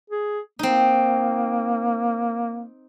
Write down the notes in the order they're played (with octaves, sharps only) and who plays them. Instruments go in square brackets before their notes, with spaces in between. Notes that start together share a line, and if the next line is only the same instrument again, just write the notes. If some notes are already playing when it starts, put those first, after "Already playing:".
[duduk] G#4
[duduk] A#3 [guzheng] C4 D#4